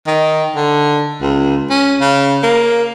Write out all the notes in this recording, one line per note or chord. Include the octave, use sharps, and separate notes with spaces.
D#3
D3
C#2
C#4
C#3
A#3